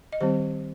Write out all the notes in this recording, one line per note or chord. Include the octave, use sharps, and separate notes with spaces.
D#5
D#3 G3 C4 G4 C5